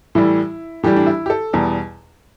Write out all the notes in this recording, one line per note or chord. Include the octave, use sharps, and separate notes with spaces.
A2 E3 G3 E4
A2 E3 G3 G4
D4
E4
G4
A4
E2 B2 G3